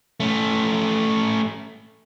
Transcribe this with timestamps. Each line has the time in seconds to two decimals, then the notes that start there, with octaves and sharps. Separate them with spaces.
0.20 A3 C#4